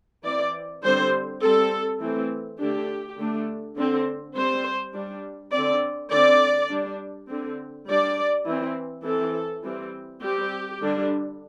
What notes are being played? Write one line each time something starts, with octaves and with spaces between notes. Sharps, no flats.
E3 C4 D5
D3 G3 C4 C5
G3 C4 A4
E3 A3 C4
D3 A3 D4 G4
D3 A3 D4
D3 C4
G3 C4 C5
G3 D4
D3 C4 D5
D3 C4 D5
G3 D4
D3 C4
G3 D4 D5
E3 C4
E3 C4 A4
E3 G3 C4
G3 C4 G4
D3 G3 D4